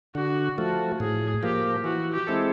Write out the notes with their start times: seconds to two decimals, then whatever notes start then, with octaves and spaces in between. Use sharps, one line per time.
0.15 D3 F#4
0.57 F3 A3 F#4
1.00 A2 G#4
1.42 F3 A#3 G4
1.84 E3 F#4
2.13 G4
2.27 G#3 C4 E4 A4